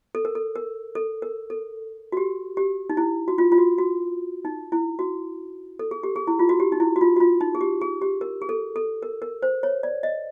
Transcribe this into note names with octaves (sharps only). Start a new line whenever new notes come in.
A4
A#4
A4
A#4
A4
A#4
A4
F#4
G4
G4
D#4
E4
F#4
F4
F4
F#4
F#4
D#4
E4
F#4
A4
G#4
G4
G#4
E4
F4
F#4
G4
D#4
E4
F#4
F4
F#4
F4
D#4
G#4
G4
G#4
G4
A#4
G#4
A4
A4
A#4
A#4
C5
C#5
D5
D#5